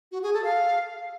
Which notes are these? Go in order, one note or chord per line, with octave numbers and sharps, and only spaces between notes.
F#4
G#4
A4
F5